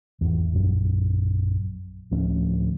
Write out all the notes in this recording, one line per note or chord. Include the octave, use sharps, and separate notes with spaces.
G#1 E2
A#1 F#2
D1 D2 F3 C#4